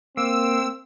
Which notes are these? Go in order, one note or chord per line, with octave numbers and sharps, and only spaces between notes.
A#3 C4 E6